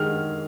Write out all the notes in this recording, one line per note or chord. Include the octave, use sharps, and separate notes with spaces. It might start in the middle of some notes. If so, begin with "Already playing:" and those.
Already playing: D#3 G#3 F6